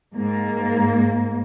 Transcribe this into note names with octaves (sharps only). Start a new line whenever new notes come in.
G#2 A#3